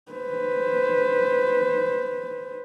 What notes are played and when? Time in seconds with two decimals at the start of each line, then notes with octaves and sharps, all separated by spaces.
0.13 B4 C5